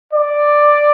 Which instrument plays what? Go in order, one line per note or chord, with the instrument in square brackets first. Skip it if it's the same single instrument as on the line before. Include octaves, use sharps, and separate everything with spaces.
[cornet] D5